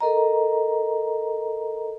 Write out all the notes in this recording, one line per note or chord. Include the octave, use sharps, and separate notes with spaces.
A4 A#4 D#5 A#5